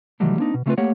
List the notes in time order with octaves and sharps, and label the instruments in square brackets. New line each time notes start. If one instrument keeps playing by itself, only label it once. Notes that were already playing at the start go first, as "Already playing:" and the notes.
[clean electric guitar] C3 D#3 E3 F#3 G3 A3
A#3 C4 D4 D#4
B2
C#3 G3 A3 C4 F4 B4
A3 A#3 G4 C#5 F#5